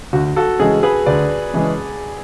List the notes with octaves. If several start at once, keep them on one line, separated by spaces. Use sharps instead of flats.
D2 F#4
F#4 A4
C#3 E3 G#3 C#4 G#4
G#4 B4
D2 B4 D5
C#3 E3 G#3 C#4